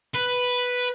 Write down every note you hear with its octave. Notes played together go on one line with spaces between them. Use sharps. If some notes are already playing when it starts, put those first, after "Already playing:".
B4